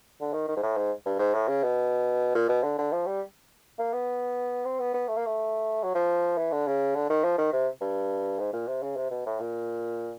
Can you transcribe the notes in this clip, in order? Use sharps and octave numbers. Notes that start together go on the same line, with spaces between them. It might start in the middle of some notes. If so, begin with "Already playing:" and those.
D3
D#3
D#3
G#2
A2
G#2
G2
G#2
A2
C#3
B2
A#2
B2
D3
D3
F3
G3
A#3
B3
C4
B3
B3
A3
A#3
A3
F#3
F3
E3
D3
C#3
D3
D#3
F3
D#3
C3
G2
G#2
A#2
C3
C#3
C3
B2
A2
A#2